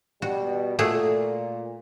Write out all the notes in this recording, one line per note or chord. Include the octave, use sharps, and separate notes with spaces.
B2 G3 F#4
A#2 A3 F#4 G#4